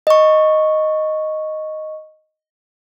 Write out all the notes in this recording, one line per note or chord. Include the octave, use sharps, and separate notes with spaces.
D#5 C#6